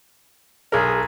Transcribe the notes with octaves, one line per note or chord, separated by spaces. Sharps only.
B1 G#4 A#4